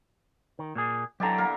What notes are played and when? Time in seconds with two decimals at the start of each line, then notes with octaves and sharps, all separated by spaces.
0.59 D#3
0.75 A#2 A#3 G#4
1.20 D3 E3 F#3 G4 D5 A#5
1.38 A#3 B3 A#4